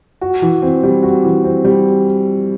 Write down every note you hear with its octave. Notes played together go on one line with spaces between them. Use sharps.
F#4
E3
C4
G3
F#4
E3
C4
G3